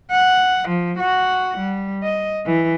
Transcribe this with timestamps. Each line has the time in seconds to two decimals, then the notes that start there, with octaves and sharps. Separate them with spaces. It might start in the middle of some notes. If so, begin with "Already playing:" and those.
0.11 F#5
0.68 F3
0.99 F#4 F#5
1.57 G3
2.03 D#5
2.46 E3